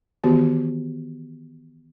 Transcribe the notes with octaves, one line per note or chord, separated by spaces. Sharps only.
D#3 E3 B3 F#4 G4